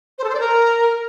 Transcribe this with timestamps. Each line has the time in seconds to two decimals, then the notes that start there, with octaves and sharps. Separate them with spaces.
0.18 C5
0.24 A4
0.29 C5
0.34 D5
0.40 A#4